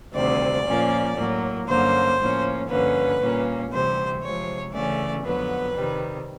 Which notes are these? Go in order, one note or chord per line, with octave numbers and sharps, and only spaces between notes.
D2 C3 D#3 G3 C4 D5
A#2 F3 A#3 C#4
A2 F#3 A#3
G2 D3 F#3 A#3 C#4 C5
A2 F3 A#3 C#4
G2 D3 F3 A#3 C#4 B4
A#2 G3 A#3 C#4
D2 C3 E3 G3 C5
C3 F3 G#3 C#5
D2 C#3 E3 A3 C#4 D5
F2 D3 F#3 B3 B4
C3 D#3 G3